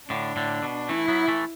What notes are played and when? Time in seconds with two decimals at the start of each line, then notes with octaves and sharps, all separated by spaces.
0.10 A2 D3 D4
0.36 A2 D3
0.63 B2
0.89 E3 A3 E4
1.08 F#3 B3
1.28 E3 A3